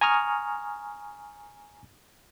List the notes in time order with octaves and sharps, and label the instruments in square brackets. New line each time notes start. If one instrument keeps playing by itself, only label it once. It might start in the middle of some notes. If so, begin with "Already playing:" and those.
[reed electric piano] G#5 A#5 C#6 D#6 F6